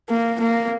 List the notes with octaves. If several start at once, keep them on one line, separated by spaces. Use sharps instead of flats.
A#3
A#3